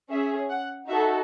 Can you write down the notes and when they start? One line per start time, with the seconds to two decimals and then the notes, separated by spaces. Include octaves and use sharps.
0.11 C#4 G#4 E5
0.50 F#5
0.89 D#4 F#4 A4 E5